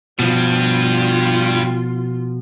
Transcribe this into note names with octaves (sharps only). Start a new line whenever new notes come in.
G2 B2 F3 G3 F4